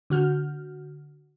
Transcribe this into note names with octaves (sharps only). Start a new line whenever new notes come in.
D3 F#4 F6 G6